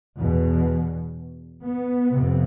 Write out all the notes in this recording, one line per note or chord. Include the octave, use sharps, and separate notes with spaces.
E2 B2
B3
F2 C3